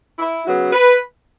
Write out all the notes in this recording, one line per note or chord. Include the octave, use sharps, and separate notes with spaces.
E4
C#3 F#3 B3 F#4
B4